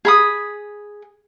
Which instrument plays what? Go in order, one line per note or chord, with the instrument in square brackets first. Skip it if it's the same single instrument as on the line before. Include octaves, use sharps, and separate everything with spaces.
[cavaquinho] G#4 B5 D#6